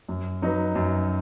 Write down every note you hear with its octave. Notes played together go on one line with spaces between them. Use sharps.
F#2
F#3 D#4 F#4 B4
F#2